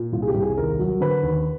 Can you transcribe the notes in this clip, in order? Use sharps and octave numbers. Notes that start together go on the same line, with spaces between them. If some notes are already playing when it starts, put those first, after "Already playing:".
Already playing: A#2
C2 F4
G#4
G4
C2
G#4
D#2 A#4
F#3
D3 B4
D#2